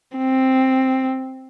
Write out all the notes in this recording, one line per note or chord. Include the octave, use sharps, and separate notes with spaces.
C4